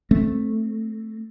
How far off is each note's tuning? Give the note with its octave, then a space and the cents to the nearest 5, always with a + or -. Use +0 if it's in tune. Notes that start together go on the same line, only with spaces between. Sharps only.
A3 +0 C4 +10